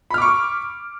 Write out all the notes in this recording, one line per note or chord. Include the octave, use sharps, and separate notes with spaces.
B5 C#6 D6 F6